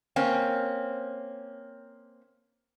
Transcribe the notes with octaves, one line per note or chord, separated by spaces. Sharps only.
A#3 C4 C#4